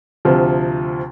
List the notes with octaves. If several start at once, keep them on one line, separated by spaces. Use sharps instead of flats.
D2 C3 F3 C4